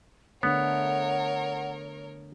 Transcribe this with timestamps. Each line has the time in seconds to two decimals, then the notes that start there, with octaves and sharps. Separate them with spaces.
0.43 D3 A3 B3 D4 A#4 C#5 F#5